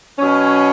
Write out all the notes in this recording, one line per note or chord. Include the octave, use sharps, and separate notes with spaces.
B2 F#3 C#4